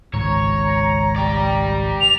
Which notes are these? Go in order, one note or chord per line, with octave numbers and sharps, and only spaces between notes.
G#1 C#2 G#2 C#5 A#5
G4 D5
F7